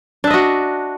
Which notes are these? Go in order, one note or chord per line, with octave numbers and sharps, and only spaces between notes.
D4 F#4 D#5 E5